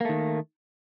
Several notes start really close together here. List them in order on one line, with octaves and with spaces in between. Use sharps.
A#3 A3 D#3